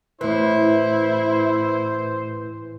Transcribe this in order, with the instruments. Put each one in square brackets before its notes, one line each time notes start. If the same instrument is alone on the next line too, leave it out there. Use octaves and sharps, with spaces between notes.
[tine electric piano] A2 B4 [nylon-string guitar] E3 [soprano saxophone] E4 [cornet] C5